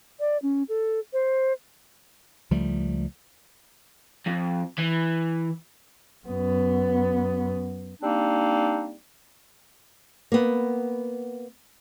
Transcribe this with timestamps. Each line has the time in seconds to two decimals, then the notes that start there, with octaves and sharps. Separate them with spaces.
0.20 D5
0.42 C#4
0.69 A4
1.13 C5
2.51 C#2 F3 G3 A3
4.26 F2
4.78 E3
6.27 F#2 B3
8.02 G3 A#3 C4 D4 D#4
10.32 A#3 B3